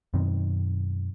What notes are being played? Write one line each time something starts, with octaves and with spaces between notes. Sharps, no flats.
F#2 B2 D#3 C4